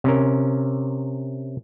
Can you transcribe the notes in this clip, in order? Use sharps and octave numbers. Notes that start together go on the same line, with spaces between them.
C3 C#4 A#4